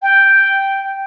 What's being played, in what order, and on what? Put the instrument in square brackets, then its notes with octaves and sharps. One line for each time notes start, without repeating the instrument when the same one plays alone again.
[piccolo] G5